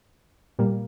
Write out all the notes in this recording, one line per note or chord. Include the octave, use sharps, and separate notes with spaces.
A#2 G3 A#3